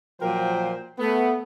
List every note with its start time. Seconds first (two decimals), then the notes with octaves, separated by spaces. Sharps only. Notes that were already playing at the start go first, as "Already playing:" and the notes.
0.21 A#2 F3 F#3 A#4 C5 G5
0.99 A3 B3